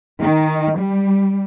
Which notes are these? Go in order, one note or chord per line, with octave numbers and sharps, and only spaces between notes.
D#3
G3